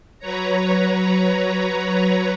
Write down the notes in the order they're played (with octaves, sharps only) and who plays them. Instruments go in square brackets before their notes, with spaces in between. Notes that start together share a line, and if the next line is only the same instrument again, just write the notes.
[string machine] F#3 B4 C#5 A#5